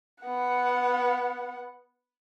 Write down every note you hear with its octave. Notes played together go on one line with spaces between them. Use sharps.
B3 F#5